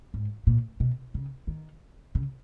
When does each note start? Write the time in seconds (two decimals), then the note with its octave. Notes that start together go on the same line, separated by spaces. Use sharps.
0.14 G#2
0.47 A#2
0.80 B2
1.14 C#3
1.47 D#3
2.15 C#3